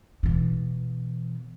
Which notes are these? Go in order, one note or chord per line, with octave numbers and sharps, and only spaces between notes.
B2 E3